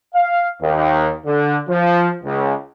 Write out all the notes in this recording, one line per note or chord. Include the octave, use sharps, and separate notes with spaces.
F5
D#2
D3
F3
C#2